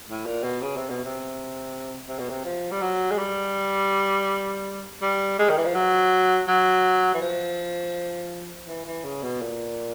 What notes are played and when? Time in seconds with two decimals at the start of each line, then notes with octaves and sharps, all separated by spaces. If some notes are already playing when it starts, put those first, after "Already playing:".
0.08 A2
0.26 A#2
0.44 B2
0.62 C#3
0.76 C3
0.90 B2
1.05 C3
2.08 C3
2.19 B2
2.30 C3
2.45 F3
2.72 G3
2.82 F#3
3.12 G#3
3.18 G3
5.02 G3
5.39 G#3
5.49 D#3
5.57 E3
5.66 F3
5.75 F#3
6.48 F#3
7.14 E3
7.21 F3
8.67 E3
8.86 E3
9.05 C#3
9.23 B2
9.42 A#2